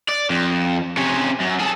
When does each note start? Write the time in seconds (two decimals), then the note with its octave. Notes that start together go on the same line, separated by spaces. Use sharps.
0.09 D5
0.30 F2
0.97 C3 C#4
1.41 F#2
1.60 G#4 A4